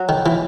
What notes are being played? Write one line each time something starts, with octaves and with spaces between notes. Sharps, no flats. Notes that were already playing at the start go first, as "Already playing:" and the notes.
Already playing: F#3
D#3
E3